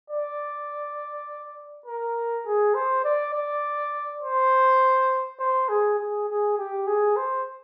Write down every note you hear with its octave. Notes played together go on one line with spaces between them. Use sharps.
D5
A#4
G#4
C5
D5
D5
C5
C5
G#4
G#4
G#4
G4
G#4
C5